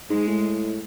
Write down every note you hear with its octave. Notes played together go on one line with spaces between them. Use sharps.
G#2 G#3
A2